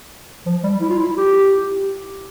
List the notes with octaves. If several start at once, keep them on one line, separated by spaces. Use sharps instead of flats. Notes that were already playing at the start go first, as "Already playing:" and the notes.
F3
G3
E4
F4
E4
G4